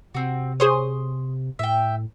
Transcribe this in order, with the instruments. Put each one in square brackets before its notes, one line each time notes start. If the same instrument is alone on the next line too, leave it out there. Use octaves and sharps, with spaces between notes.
[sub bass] C3 [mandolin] C4 F#4
[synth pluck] G#4 C5 C#5 [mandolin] C6 D#6
[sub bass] A2 [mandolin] E5 G5